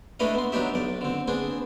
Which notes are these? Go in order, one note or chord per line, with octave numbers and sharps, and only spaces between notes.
A3 D4 E4 B4 D#5 F5
B3 C6
F#3 B3 D4 D#4 G4 E5
B1 D5
D3 C4
B3 C4 D4 G#4